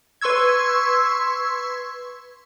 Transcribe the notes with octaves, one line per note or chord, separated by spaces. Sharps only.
B4 C6 C#6 E6 G#6